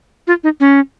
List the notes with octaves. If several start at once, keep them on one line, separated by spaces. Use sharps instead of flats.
F4
D#4
C#4